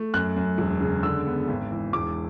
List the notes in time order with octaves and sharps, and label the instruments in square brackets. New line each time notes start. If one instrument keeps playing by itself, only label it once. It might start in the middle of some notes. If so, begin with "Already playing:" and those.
Already playing: [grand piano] A3
F#2 F#6
F#2
E1
C#3
D3 E6
B3
G#1
E3
E1 D6